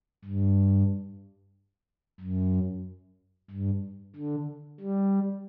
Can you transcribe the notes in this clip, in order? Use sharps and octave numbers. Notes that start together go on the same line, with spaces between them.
G2
F#2
G2
D3
G3